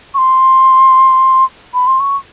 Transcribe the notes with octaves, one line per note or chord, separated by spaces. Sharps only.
C#6
C6
B5
C6
C#6